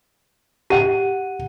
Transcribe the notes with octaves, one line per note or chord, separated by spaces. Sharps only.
G4 F#5 D#7